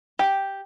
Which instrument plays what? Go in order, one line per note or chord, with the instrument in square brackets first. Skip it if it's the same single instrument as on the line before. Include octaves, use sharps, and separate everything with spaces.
[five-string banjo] G4